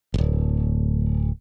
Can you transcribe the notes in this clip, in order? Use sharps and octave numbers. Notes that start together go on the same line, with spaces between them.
D1 G1